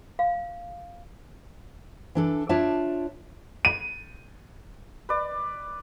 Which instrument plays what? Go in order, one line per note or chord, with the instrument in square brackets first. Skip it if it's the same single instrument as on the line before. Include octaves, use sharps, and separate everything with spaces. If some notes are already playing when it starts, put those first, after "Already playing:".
[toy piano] F5
[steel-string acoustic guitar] E3 D4 A4
D4 F4 C#5 D5 E5 A5
[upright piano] D#7
[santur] B4 D5